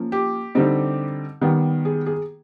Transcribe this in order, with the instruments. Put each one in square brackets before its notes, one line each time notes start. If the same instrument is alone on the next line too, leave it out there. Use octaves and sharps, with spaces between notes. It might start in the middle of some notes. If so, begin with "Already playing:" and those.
Already playing: [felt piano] F3 A#3 C#4
G4
D3 G3 C4 D#4
D#3 G3 B3
G#4
G#4